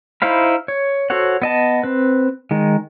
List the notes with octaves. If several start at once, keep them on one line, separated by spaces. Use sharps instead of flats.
D#4 E4 C5 F5 B5
C#5
F#4 A4 C5 C#5 F#5
B3 D#5 A5
C4 B4
D#3 G#3